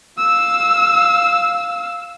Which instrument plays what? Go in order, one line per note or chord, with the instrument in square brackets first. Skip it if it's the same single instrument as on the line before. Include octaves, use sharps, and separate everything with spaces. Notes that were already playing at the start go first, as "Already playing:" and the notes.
[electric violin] F5 E6